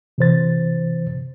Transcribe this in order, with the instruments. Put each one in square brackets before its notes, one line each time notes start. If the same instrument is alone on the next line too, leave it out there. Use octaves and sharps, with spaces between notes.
[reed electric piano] C3 E3 C5 A6